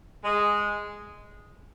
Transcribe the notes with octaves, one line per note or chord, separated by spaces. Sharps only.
G#3